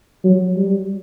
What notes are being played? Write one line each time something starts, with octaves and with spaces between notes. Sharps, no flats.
F#3
G3